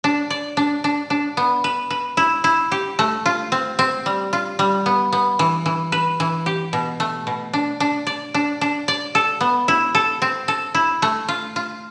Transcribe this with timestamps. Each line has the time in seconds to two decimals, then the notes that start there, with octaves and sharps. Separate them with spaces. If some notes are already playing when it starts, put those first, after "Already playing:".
0.04 D4
0.30 D5
0.57 D4
0.84 D4
1.10 D4
1.37 B3
1.64 B4
1.90 B4
2.17 E4
2.44 E4
2.72 G4
2.99 A3
3.26 F4
3.52 C4
3.79 C4
4.06 G3
4.33 F4
4.59 G3
4.86 B3
5.13 B3
5.39 E3
5.66 E3
5.92 B4
6.20 E3
6.46 G4
6.73 B2
7.00 A3
7.27 B2
7.53 D4
7.80 D4
8.07 D5
8.34 D4
8.61 D4
8.88 D5
9.15 A4
9.41 B3
9.68 E4
9.95 A4
10.22 C4
10.48 A4
10.75 E4
11.02 A3
11.29 F4
11.56 F4